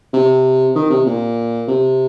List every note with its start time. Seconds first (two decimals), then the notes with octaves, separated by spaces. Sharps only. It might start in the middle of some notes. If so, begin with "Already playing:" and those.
0.13 C3
0.75 D#3
0.90 C3
1.06 A#2
1.68 C3